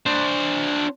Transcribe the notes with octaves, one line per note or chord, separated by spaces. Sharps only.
D4 C5